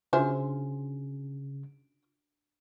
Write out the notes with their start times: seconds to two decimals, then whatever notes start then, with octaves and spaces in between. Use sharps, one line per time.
0.13 C#3 D4 F4 F#4 C5 E5 G#5